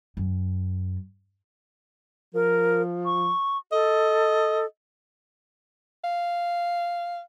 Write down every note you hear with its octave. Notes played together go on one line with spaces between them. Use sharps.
F#2
F3 A#4
C#6
A4 D#5
F5